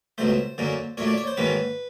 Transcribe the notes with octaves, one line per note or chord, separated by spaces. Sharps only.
C#2 B2 F#3 A3 C5
F#2 D3 F#3 A#3 C#4
A#2 F#3 A3 D4 C#5
D5
C#5
C5
G#2 D#3 F#3 A#3 C#4 B4